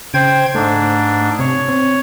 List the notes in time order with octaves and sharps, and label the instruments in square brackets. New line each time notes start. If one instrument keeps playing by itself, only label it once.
[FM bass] C#3 [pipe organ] C5 G5 G#6
[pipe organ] G#2 D4 [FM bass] A3
[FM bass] C3 [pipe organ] C#5
[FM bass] C4